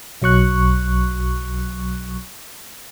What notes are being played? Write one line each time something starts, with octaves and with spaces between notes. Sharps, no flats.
B1 F#3 C#6 F#6